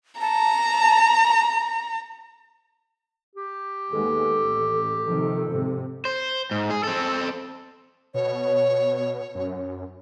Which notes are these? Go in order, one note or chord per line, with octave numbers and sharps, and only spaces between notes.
A5 A#5
G4
D#2 G#3 B3 A4
A1
C3 D#3 F3
G#2 C3
C5
G#2
G#4
C4 A4
B2 C#5
F#2